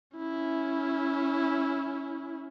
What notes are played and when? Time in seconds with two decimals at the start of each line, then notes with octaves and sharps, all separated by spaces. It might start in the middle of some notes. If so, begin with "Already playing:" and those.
0.17 C#4 E4